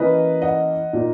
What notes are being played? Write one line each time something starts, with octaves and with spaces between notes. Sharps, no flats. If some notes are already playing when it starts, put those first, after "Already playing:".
Already playing: E3 A#3 C#4 B4 D#5
D#5 F#5
A#2 A#3 D#4